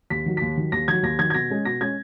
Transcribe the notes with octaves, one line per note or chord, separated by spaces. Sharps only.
D#2 B6
D#3 F#3
D#2 B6
D#3 F#3
D#2 A#6
D#3 F#3 G#6
D#2 A#6
D#3 F#3 G#6
G#6
B2 A#6
G#3 C#4
B2 A#6
G#3 C#4 G#6